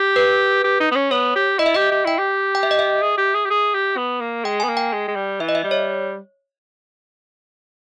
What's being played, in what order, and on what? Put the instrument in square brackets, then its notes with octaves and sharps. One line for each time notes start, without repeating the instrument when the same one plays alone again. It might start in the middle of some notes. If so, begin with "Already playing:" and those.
Already playing: [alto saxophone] G4
[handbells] B4
[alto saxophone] G4
D#4
B3
C#4
[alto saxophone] B3 [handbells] C#5
[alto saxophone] G4
[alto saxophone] E4 [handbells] D#5
[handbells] E5
[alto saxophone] G4 [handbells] D#5
[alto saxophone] G4
[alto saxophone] E4 [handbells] G5
[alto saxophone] G4
[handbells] G5
E5
D#5
E5
[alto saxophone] G#4
G4
G#4
G4
G#4
G4
B3
A#3
[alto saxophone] G#3 [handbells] G5
[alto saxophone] B3 [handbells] G#5
[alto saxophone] A#3
[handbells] G5
[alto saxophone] G#3
G#3
G3
[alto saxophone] E3 [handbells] E5
[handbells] D#5
E5
[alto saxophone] G3
[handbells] C#5